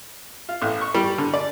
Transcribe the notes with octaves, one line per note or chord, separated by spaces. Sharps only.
F4
A1
C#6
G3
D3
D5